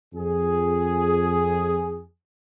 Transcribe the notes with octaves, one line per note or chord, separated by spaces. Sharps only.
F2 G#4